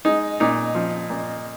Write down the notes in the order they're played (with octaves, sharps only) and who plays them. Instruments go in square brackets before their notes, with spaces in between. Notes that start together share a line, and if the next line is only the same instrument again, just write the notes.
[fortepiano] G#3 D#4
A#2 D#4
F3
A#2